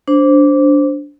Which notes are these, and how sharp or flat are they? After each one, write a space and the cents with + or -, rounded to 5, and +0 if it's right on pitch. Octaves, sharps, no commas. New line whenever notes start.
D4 -15 C5 +0